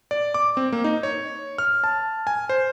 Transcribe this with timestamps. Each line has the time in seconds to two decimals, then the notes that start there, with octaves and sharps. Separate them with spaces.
0.11 D5
0.34 D6
0.57 C4
0.72 A#3
0.84 D#4
1.03 C#5
1.58 F6
1.84 A5
2.27 G#5
2.49 C5